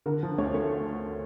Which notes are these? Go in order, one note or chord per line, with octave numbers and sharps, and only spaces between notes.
D3 A#4
F3
D2 C#5
A3